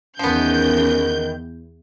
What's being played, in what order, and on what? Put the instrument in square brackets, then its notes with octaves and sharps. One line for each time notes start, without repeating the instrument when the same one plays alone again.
[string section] E2 G6 [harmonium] D#3 [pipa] F3 B3 [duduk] C#4